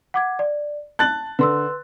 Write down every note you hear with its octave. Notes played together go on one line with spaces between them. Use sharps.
F#5 D6 G#6
D5
A5 F#6 A6 F#7
D3 B4 C6 E6